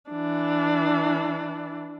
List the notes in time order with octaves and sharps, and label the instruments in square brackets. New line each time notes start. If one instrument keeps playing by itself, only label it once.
[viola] E3 D4